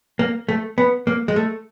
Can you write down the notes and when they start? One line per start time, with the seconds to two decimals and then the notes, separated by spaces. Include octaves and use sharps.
0.19 A#3
0.49 A3
0.78 B3
1.07 A#3
1.28 G#3
1.36 A3